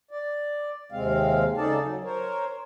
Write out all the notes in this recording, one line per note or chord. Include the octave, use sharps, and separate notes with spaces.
D5
D#2 C3 G#3 C4 F5
C#3 D#4 G#4 A4 D5 A5
F#3
A#4 C5 C#5